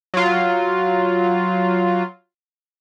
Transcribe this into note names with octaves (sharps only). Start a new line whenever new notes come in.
F#3 F4